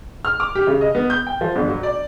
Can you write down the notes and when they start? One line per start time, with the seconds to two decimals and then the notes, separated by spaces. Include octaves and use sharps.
0.25 F6
0.40 D6
0.55 G4
0.67 C#3
0.81 D#5
0.95 B3
1.10 G6
1.27 G5
1.41 F3
1.56 G1
1.68 F#3
1.83 D5